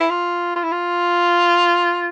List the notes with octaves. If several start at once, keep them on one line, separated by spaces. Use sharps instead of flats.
E4
F4
F4
E4
F4